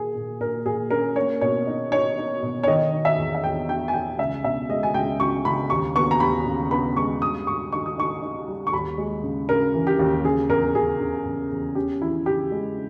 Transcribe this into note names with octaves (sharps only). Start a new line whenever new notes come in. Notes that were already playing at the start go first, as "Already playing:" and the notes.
Already playing: A#2 A#3 G#4
A#2
A#2 A#4
A#2 G#4
C#4 A#4
A#3 C#5
B2 C#5
D#4
D#4 C#5
D#4
B2
C#5
D#3 D#5
D#4
E5
E2
E5
E2 G5
D#4 G5
G#5
D#4 G5
C#2 E5
B2 E5
G#3 D#5
G#5
C#2 G5
C#2 C#6
C#2 B5
D#2 C#6
B3 C#6
A#5
D#2 B5
C#3
B3 B5
G#3 C#6
G2 D#6
G2 C#6
D#4 C#6
D#6
D#4 C#6
D#4
G3
C#6
D#2 B5
G#3
C#3
C#3 A#4
E3
G4
D#2
C#3 G#4
E2 A#4
C#3 G#4
C#3
E2
E2
C#4 G4
E3 E4
C#3 G4
G#3